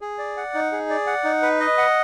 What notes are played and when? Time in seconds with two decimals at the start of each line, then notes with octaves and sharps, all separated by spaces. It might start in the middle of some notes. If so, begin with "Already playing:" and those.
0.01 G#4
0.18 D5
0.37 F#5
0.54 D#4
0.72 G#4
0.90 D5
1.07 F#5
1.24 D#4
1.42 B4
1.60 D#5
1.78 F#5